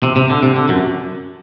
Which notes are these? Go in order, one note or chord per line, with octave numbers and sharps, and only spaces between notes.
C3
C3
D3
C3
D3
F#2 F#3